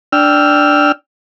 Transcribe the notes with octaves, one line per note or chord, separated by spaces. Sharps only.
D4 G5 E6 F6